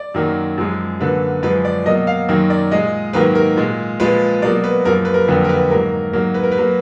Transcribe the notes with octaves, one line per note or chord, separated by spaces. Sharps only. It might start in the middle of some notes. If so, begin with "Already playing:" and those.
Already playing: D5
F#2 D#3 F#3 A#3
F#2 F3 G#3
F#2 D3 F#3 A#3 B4
F#2 F3 G#3 B4
D5
B2 F#3 A#3 D#5
F5
F#2 D#3 F#3 A#3
D5
A#2 G#3 D#5
G#2 D#3 F#3 A#3 B4
A#4
A#2 G#3
A#2 F3 G#3 B4
B2 F#3 A#3 D5
B4
F#2 F3 A#3 A#4
B4
A#4
F2 D3 F#3 A#3 B4
A#4
B4
G#2 F#3 A#3 A#4
G#2 F#3 A#3 A#4
B4
A#4
B4
F#3 A#3